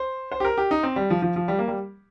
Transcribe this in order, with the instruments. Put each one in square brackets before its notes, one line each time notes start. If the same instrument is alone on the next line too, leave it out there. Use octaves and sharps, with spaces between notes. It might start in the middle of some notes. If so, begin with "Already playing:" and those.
Already playing: [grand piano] C5
C5
G4
A#4
G4
D#4
C4
G3
F3
F3
F3
G3
A#3
G3